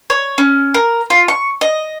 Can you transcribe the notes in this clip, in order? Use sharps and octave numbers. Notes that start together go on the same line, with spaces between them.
C#5
C#4
A#4
F4
C#6
D#5